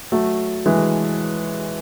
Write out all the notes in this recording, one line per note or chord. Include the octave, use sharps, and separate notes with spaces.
F#3 A3
E3 G#3